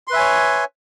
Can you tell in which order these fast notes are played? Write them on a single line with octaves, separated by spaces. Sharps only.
C6 B4 E5 G#5 C#5